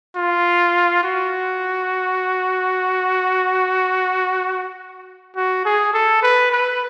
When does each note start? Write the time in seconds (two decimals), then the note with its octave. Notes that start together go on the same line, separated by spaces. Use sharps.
0.16 F4
1.04 F#4
5.36 F#4
5.65 G#4
5.94 A4
6.23 B4
6.52 B4